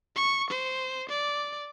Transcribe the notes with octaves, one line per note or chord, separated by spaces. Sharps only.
C#6
C5
D5